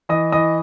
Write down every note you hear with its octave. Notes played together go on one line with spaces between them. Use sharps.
E3 D#5 D#6
E3 D#5 D#6